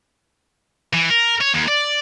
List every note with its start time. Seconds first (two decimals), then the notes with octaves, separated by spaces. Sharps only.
0.93 E3
1.10 A#4
1.41 C#5
1.54 D#2
1.68 D5